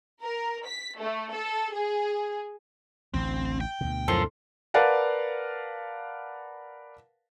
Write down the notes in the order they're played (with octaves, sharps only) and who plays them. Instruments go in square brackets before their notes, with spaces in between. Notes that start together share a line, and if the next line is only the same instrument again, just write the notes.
[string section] A#4
B6
A3
A4
G#4
[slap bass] A1 D2 [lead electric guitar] C4
[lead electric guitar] G5
[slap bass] D2 B2
[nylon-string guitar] F#2 F3 [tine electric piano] A4 C6
[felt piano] A#4 B4 D5 F5 F#5 A5